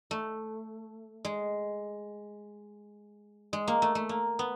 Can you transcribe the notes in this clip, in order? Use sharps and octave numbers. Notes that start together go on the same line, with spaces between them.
A3
G#3
G#3
A#3
A3
A3
A#3
B3